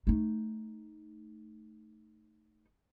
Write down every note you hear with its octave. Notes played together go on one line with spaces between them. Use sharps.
A3 D#4